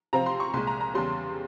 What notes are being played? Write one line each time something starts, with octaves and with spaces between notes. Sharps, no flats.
C3 F3 C4 A#5
C6
C#6
C2 A#2 G#3 C6
A#5
A#5
E2 C#3 G3 C#4 C6